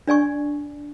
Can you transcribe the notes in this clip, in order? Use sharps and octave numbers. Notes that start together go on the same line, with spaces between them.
D4 D5 G#5 C#6